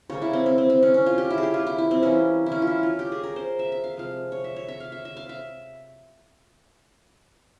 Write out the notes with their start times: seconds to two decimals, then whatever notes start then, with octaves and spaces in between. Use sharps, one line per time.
0.10 C#3 G3 A#3 C#5
0.22 E4
0.33 C4
0.46 C4
0.58 C4
0.70 C4
0.83 C#4
0.94 C#4
1.06 F4
1.18 G4
1.31 E4
1.38 G#4
1.43 G4
1.54 F4
1.67 E4
1.78 E4
1.91 C4
2.03 E3 G3 A#3 C#4
2.46 E4
2.52 C#4
2.62 F4
2.67 E4
2.83 F4
2.99 G4
3.12 G#4
3.23 A#4
3.36 C5
3.59 E5
3.72 E5
3.84 F5
3.96 C3 F3 G#3 F5
4.32 C#5
4.44 E5
4.56 C#5
4.68 E5
4.80 F5
4.92 E5
5.05 E5
5.17 F5
5.29 E5